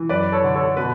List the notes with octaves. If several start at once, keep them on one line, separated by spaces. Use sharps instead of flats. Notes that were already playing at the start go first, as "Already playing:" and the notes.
Already playing: E3
F#2 B4 D5
A4 C#5
D3
A4 C#5
B2 B4